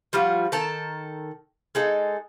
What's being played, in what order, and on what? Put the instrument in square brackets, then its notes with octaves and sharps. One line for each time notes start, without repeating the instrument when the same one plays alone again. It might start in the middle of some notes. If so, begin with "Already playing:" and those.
[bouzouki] F3 G3 F4 F#4
D#3 A4 A5 A#5
G#3 D#4 A4